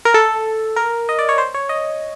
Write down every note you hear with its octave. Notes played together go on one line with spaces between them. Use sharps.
A#4
A4
A#4
D#5
D5
C#5
C5
C#5
D#5